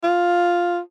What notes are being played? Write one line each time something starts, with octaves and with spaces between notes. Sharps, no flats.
F4